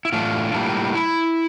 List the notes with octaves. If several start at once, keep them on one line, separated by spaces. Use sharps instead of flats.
E4
A2 E3 A3 D4 F4
A2 G3 A#3
E4